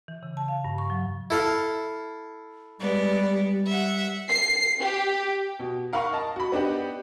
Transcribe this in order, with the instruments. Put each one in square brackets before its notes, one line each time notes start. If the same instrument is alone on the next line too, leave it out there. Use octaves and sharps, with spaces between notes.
[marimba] E3
C#3
A5
F5
G2
C#6
F#3
[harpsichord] E4 A4 F5
[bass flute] G3 [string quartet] G#3 B3 D5
[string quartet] E5 F#5
[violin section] C7
G4
[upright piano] B2
A#4 F5 F#5 B5 C#6
D#5 A5
F#4 B5
B3 D4 D#4 G4 F#5